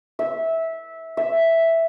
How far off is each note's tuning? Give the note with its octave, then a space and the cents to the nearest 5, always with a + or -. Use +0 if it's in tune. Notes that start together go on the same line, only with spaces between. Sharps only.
E5 -15
E5 +0